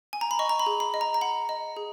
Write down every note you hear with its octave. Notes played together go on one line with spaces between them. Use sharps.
G#5
A#5
B5
D#5 C#6
A#5
B5
G#4
B5
D#5
A#5
A#5
F#5 B5
D#5
G#4